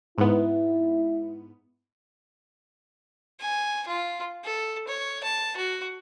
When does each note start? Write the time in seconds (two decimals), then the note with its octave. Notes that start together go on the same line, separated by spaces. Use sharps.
0.18 G#2 B3 E4
3.40 G#5
3.87 F4
4.44 A4
4.88 C#5
5.24 A5
5.57 F#4